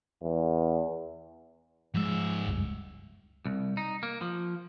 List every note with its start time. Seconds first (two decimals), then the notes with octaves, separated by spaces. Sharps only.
0.22 E2
1.94 G#2 F3 G#3 E5
2.46 F1 C#2 G2
3.46 C2
3.77 D#4
4.03 A#3
4.21 F3